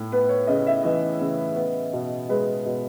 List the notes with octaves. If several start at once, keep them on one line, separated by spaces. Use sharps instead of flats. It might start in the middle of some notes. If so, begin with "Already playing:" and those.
Already playing: A2
B3 B4
C#5
C#3 D#5
E5
E3 D#5
C#3
B3
B2
G#3 B4
B2